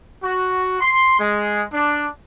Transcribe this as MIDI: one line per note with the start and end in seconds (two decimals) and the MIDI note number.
0.23 0.76 66
0.80 1.15 84
1.19 1.63 56
1.72 2.07 62